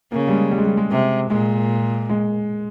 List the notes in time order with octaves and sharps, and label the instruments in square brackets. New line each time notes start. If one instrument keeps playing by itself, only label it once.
[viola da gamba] C#3 [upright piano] A#3
[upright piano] G3
G#3
G3
G#3
G3
G#3
[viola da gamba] C3
[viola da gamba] A#2 [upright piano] G#3
[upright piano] G#3